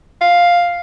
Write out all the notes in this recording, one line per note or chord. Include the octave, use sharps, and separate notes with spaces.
F5